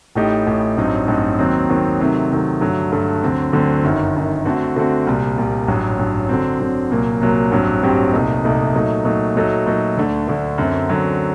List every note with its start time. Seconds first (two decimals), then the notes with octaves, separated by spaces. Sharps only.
0.15 A1 A2 A3 D#4 G4
0.47 A1 A2 A3 D#4 G4
0.77 A1 G2 F#3 C4 D#4
1.08 A1 G2 F#3 C4 D#4
1.39 D#2 D#3 F#3 C4
1.69 D#2 D#3 F#3 C4
2.00 C3 D#3 F#3 A3
2.30 C3 D#3 F#3 A3
2.61 G2 D3 F#3 A3
2.92 G2 D3 F#3 A3
3.23 D2 D3 F#3 C4
3.53 D2 D3 F#3 C4
3.84 G1 F#2 D#3
4.15 G1 F#2 D#3
4.45 D3 A3 C4 F#4
4.76 D3 A3 C4 F#4
5.07 C2 A#2 G3
5.38 C2 A#2 G3
5.68 A1 G2 F#3
5.99 A1 G2 F#3
6.29 D3 F#3 C4
6.60 D3 F#3 C4
6.90 C2 A#2 F#3 A#3
7.21 C2 A#2 F#3 A#3
7.51 A1 G2 F#3 C4 G4
7.82 A1 G2 F#3 C4 G4
8.13 C2 A#2 A3 D#4
8.44 C2 A#2 A3 D#4
8.75 A#2 F#3 A3 D#4
9.04 A#2 F#3 A3 D#4
9.35 A#2 F#3 A3 D#4 A4
9.66 A#2 F#3 A3 D#4 A4
9.97 D2 D3 A3 D4
10.27 D2 D3 A3 D4
10.58 F#2 D3 F#3 C4
10.89 F#2 D3 F#3 C4